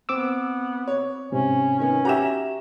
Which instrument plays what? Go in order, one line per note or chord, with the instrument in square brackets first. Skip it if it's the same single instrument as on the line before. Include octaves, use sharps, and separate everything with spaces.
[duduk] B3 [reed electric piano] C4 D6 E6
[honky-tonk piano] C#5
[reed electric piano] G#2 C3 [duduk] C#4
[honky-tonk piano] D#3 B3 [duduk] C#4
[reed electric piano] F#4 G4 E5 [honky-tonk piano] A#5 E7